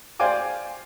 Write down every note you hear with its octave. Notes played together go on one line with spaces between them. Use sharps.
C5 D5 F5 G5 G#5 D6